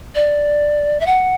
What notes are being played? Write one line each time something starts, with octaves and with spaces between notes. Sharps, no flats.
D5
E5
F#5